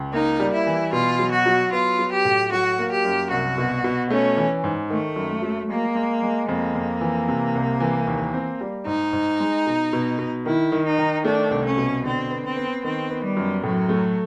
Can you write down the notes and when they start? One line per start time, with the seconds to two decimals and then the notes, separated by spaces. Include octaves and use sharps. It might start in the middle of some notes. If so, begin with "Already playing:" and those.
Already playing: C#2
0.13 A#3 D#4
0.39 G3
0.54 E4
0.67 E3
0.93 B2 F4
1.19 F#3
1.32 F#4
1.46 F#3
1.72 B3 F4
1.99 F#3
2.12 G4
2.25 A2
2.52 F#3 F#4
2.79 A#3
2.91 G4
3.05 F#2
3.31 C2 F#4
3.58 B2
3.84 B2
4.10 A3 C#4
4.37 E3
4.64 G#2
4.90 D#3 A3
5.16 F#2
5.42 F#3
5.69 G#3 A#3
5.95 G#3
6.23 G#3
6.48 F2 A#3
6.75 F2
7.01 E3
7.28 C3
7.55 C2
7.80 E3
8.07 D#2
8.34 C4
8.61 G3
8.86 G#2 D#4
9.13 G#2
9.40 G#3
9.67 B2
9.93 B2
10.19 B2
10.46 D#3 E4
10.72 D#3
10.85 D#4
10.98 D#3
11.25 A3 D4
11.51 C2
11.64 C#4
11.78 B2
12.04 D3 C4
12.30 B3
12.44 C4
12.56 B3
12.84 D#3 C4
13.10 B3
13.23 G3
13.37 F#2
13.63 A2 F#3
13.89 A3